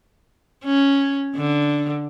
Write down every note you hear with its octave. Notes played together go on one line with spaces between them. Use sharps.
C#4
D3